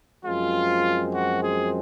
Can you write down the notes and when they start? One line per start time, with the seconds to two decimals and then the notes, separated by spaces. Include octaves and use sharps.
0.24 F#2 F3 G#3 C4 F4
1.13 F#4
1.43 G#4